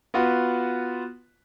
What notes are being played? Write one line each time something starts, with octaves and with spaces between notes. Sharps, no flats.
B3 F4 F#4 B4